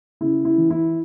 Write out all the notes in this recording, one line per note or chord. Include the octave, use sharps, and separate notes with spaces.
C#3 E4
E4
E3
E4